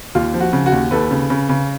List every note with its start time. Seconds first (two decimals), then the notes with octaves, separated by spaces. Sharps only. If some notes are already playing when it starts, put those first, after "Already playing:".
0.15 D#2 F4
0.34 F3
0.40 F#4
0.53 C#3
0.66 F#4
0.72 D#2
0.91 D#2 A4 B4
1.11 C#3
1.30 C#3
1.49 C#3